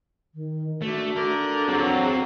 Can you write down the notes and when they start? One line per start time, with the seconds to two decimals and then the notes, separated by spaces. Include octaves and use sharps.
0.35 D#3
0.82 D3 A3 F#4
1.16 D3 A#4
1.68 F#3 C4 G#4 A4